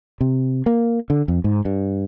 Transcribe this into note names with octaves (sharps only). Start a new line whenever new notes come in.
C3
A#3
D3
F2
G#2
G2